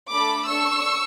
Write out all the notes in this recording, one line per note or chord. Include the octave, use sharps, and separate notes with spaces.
A3 D4 A4 B5 D6
D4 A4 C#6 E6